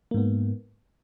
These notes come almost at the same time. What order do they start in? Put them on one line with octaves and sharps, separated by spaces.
A#3 G#2 B3